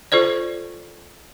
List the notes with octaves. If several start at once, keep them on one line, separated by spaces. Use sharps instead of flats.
F4 A4 C5 D5